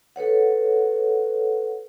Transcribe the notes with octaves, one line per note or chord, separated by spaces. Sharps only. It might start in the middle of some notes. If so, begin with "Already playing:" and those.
A4 B4 C#5 F#5